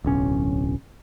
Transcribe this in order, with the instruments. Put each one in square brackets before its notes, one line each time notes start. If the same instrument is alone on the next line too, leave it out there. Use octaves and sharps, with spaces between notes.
[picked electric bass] D1 B1 C#4